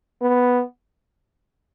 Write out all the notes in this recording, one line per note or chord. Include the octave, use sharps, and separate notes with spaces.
B3